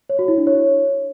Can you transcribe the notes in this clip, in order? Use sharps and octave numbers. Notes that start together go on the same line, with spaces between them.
C#5
F#4
E4
D4
C#5